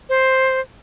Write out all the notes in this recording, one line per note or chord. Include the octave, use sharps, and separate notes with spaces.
C5